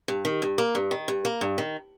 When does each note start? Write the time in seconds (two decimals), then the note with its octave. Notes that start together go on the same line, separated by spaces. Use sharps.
0.08 G2
0.25 D#3
0.42 G2
0.58 A#3
0.75 G2
0.91 D#3
1.08 G2
1.25 A#3
1.41 G2
1.58 D#3